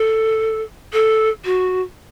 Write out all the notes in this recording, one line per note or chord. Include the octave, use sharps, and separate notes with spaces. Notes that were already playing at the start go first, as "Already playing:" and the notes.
Already playing: A4
A4
F#4